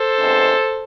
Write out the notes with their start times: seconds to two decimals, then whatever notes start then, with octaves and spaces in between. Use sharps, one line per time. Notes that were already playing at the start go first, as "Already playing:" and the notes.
Already playing: A4 C5
0.18 F2 C3 G#3 B3 D4